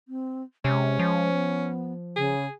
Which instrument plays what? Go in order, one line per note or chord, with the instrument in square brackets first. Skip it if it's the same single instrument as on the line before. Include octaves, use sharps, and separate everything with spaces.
[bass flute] C4
[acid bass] C3 [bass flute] G#3 [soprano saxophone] C#4
[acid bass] F3
[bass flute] B3
[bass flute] C#3 [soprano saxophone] G#4